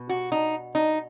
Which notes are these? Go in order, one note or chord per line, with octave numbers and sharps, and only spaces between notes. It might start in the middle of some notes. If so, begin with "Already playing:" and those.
Already playing: B2
F#4
D#4
D#4